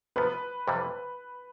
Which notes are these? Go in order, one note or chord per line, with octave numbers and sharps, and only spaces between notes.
C3 F3 B3 B4
F2 C3 E3 G3